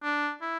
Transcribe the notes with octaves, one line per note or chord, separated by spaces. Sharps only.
D4
E4